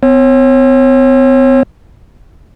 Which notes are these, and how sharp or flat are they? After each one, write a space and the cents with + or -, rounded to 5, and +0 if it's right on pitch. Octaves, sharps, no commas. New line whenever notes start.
C4 -45 C#5 -30